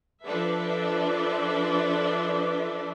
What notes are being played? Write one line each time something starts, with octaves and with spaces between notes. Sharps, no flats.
F3 D4 A4 B4 D5 E5